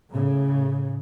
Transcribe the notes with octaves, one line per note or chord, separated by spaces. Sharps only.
A2 C#3